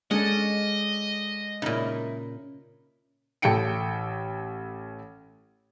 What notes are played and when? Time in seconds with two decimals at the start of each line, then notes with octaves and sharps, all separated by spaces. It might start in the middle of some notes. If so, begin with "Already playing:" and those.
0.11 G#3 C#4 D4 A4 D#5 F#5
1.62 A#2 C#3 D#4 E4
3.42 A1 A4 G5 C#7 D7